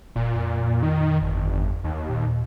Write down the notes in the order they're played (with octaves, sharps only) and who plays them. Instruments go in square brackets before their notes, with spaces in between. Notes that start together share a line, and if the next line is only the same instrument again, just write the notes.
[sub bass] F1 [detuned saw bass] A#2
[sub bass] F2
[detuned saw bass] D#3
G1
D#2
[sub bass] A#2